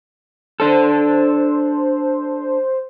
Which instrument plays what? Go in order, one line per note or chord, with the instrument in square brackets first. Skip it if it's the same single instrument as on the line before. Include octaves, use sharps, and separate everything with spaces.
[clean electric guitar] D4 A4 [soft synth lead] C5